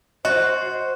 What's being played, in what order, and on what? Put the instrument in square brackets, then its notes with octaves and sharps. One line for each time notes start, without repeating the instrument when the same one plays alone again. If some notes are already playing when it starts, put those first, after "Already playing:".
[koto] F#4 [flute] C5 [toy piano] D#5